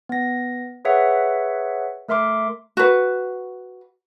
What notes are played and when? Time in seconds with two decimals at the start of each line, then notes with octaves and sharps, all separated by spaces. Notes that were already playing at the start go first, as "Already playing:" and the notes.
0.09 B3 A#6
0.85 G#4 B4 C#5 E5 F#5
2.08 A3 A#4 E5 C6 D6
2.77 F#4 B4